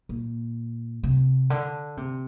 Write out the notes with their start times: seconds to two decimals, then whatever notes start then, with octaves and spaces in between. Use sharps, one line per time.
0.09 A#2
1.03 C3
1.50 D3
1.97 C3